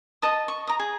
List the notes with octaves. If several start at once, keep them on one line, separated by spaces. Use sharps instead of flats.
D#5 A5 D#6
C#6
A#5 D#6
G#4